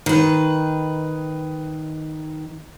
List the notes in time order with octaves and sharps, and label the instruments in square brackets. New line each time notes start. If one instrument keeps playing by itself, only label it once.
[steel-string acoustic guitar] D#3 B4